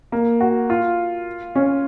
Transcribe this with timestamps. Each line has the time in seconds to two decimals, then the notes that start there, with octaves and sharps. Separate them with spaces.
0.12 A#3
0.41 F#4
0.70 F4
1.55 C#4